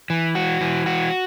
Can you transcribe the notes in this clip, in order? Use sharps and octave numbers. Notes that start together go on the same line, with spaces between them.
E3
F#4
E3
F#4